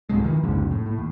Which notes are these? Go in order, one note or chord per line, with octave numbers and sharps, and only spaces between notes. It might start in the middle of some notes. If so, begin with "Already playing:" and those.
C#2 G#2 C3 G#3
D#3 F3
C2 F2 G#2 C#3
A2
A2
D#2